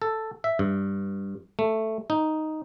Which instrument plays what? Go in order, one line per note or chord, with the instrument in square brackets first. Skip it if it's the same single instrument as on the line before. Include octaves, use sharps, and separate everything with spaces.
[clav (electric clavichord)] A4
E5
G2
A3
D#4